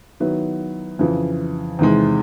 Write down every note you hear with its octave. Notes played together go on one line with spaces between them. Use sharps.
D#3 F#3 B3 E4
F2 C#3 E3
E2 C3 D#3 G#3